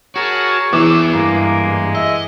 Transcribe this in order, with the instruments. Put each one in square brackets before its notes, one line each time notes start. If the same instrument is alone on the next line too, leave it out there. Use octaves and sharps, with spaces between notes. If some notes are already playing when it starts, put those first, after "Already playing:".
[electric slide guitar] F#4 [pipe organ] G#4 A#4 A5 [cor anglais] C#5
[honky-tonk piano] E3 D6 [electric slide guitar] B3 G#4 [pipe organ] E6
[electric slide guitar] G2 [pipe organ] G#3 [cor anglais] A#3
[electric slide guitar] D#5 [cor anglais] E5